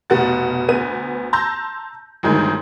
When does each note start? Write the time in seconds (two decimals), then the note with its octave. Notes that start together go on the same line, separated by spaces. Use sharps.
0.10 F1 B2 F#5 A6
0.68 D2 B3 D#7
1.33 A5 A#5 C6 E6 G6 A#6
2.23 G1 D2 D#3 G#3